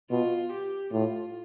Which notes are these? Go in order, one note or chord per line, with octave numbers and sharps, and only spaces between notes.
B2 F4
G4
A2 F4